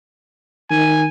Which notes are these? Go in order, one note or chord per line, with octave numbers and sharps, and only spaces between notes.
D#3 G#5